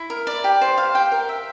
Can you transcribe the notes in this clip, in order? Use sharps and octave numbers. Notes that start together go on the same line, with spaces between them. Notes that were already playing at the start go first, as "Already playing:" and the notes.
Already playing: E4
A#4
D5
G4
C5
F5
G5
A#4
E5